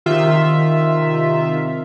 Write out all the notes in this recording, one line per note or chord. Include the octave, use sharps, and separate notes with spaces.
C3 D#3 F4 E5